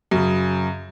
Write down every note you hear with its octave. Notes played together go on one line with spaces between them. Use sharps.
F#2 C#3